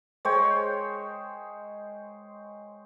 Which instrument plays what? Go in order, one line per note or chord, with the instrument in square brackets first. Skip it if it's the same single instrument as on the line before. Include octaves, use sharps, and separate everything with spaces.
[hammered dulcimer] G#3 C5 C#5 G5